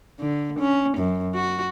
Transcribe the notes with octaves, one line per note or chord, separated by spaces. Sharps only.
D3
C#4
F#2
F#4